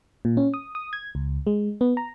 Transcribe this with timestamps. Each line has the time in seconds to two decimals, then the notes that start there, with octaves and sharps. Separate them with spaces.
0.25 A#2
0.37 C#4
0.54 D#6
0.75 D#6
0.93 G#6
1.15 C#2
1.47 G#3
1.81 B3
1.97 A#5